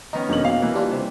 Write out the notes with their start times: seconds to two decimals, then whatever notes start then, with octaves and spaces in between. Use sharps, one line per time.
0.13 D#3 B3 C#4 D#4
0.29 E1 F#2 D3 A#3 B3 C#4 D#4 F#7
0.45 B2 F5
0.62 E3 A#3
0.75 G3 D4 F4
0.91 C3